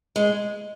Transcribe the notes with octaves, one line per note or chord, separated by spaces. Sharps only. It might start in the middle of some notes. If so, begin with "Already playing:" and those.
G#3